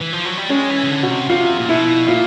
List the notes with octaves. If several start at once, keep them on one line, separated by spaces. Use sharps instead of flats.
E3
F3
F#3
G3
G#3 C#4
E3
C#3
D3
B2 F#4
C3
C3 F4
A#2
B2 E4
A#2 F4